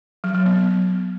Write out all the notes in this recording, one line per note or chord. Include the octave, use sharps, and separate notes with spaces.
F#3
F#3
B3